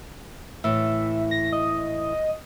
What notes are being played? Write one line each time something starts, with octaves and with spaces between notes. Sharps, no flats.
A2 E3 E5
A#6
D#5